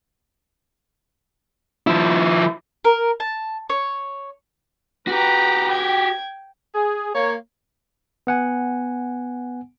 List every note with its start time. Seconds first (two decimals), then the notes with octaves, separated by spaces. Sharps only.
1.87 F3 E4
2.85 A#4
3.20 A5
3.70 C#5
5.07 F#4 G4 B4 G5 A#5
5.69 G5 G#6
6.75 G#4
7.15 A#3 C#5
8.27 B3 F#5 G#5